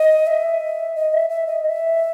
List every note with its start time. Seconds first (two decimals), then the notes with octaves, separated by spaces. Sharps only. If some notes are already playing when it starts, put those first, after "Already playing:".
Already playing: D#5
0.27 E5
0.95 D#5
1.13 E5
1.30 E5
1.47 D#5
1.65 E5